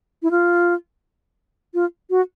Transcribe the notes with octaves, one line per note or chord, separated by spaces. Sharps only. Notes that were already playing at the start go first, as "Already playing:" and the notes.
E4
F4
F4
F#4